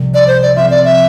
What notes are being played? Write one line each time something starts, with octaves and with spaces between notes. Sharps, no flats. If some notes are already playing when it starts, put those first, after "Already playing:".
Already playing: C2 C3 F3
D5
C5
D5
F3 C4 F4 C5 E5
D5
E5